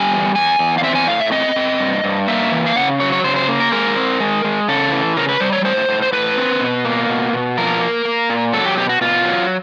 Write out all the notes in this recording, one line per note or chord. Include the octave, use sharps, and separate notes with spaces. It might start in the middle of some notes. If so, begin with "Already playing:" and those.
Already playing: G3 G#5
E2
E2 G#5
E2
F5
C4 E5
G#5
A2 F5
E5
C4 D#5
C4
G2
G2
A#3 E5
E3
F5
C#3 F#5
F#3 C#5
C#5
C#3 C5
C5
A#3
A#4
G#3 A#4
C4
G#3
G#3
C#3 A4
E3
C#3 A#4
B4
G3 C5
C#5
A2 C5
A2
C5
A2 B4
C4
B2
A#3
B2
B2
F3 A#4
A#3
A#3
A#2
F#3 A4
G4
B2 G4
F#4
B2 F4
F#3